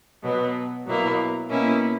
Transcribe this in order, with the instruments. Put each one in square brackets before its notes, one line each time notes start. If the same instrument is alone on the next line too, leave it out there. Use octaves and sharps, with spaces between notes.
[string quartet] B2 F#3 B3
B2 F#3 A#3 E4
B2 A#3 C#4 E4